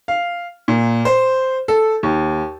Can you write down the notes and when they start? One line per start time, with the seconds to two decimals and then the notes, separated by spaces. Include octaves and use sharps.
0.08 F5
0.68 A#2
1.05 C5
1.68 A4
2.03 D#2